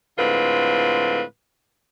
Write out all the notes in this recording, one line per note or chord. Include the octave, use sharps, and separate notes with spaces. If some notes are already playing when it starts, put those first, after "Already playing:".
A2 D3 G#3 C4 F4 B4